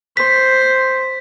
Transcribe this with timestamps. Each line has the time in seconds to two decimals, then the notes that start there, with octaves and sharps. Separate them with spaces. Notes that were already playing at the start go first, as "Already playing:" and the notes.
0.17 C5 B6